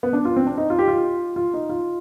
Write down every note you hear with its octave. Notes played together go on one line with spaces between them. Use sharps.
B3
D4
F4
C4
D4
D#4
F4
G4
F4
F4
D#4
F4